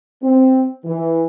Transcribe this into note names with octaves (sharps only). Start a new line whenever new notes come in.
C4
E3